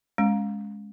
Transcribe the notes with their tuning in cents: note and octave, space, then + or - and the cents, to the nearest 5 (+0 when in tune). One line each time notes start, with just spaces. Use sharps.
G#3 +0 C#4 +0